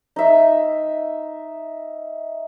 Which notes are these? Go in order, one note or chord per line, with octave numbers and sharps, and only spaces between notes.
D#4 E5